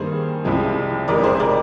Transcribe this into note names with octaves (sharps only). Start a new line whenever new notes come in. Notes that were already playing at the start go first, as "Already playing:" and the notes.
Already playing: G2 D#3 G3 A#3 G#4 C5
C2 C3 F3 G#3
F1 F2 C3 F3 G#3 A#4 D5
G#4 C5
A#4 D5